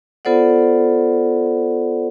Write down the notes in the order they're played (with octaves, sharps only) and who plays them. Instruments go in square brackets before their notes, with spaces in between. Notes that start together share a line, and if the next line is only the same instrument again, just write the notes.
[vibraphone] B3 F4 A4 C5 D5 F#5